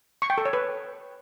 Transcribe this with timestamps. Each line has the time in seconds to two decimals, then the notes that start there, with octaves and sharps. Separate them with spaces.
0.22 C#6
0.30 G5
0.38 A4
0.45 C#5
0.53 B4